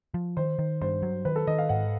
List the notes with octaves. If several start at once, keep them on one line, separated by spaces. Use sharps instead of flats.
F3
D#3 C5
D#3
G2 C5
F#3
D#3 B4
A4
D#3 D#5
F5
G#2 F#5